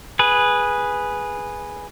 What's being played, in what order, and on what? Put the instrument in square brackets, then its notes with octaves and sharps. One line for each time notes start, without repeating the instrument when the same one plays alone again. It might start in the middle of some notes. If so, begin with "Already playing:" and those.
[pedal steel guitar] G#4 B4